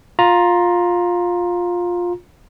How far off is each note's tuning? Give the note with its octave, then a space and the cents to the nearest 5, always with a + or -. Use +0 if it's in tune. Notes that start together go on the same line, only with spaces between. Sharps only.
F4 +15 A#5 +10